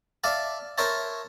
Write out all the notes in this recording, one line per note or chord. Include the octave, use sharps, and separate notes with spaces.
D5 E5 F5 A5
A#4 C5 C#5 E5 A5